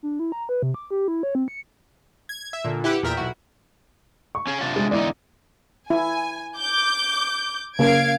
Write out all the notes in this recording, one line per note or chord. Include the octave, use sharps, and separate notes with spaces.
D4
E4
A#5
B4
C3
D6
G4
E4
C#5
C4
C#7
G#6
E5
A#2 D3
E4 G4 B4 F#5
E2 A#2 A#4 E5 G5
B1 E4 F#4
C#6
C#4 G#4
C3 D4 F4
G#3
E2 D3 D#4 E4 D5
E4 G#5
D6 G6
C#3 A#3 F5 G#6 D7